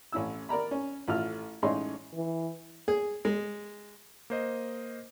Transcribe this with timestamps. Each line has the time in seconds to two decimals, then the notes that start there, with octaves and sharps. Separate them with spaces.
0.12 A1 C#4 E4 E6
0.49 A#4 D5 A#5 B5
0.71 C#4
1.08 A1 F4 A4 F6
1.62 A1 G#3 C#4 D#4 C6
2.14 E3
2.88 G#4
3.25 G#3
4.30 A#3 C5 D#5